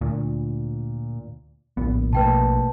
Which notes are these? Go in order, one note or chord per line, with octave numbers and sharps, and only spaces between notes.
D2 A#2
D1 A#1 B3
B2 A3 A#3 B4 G5 A5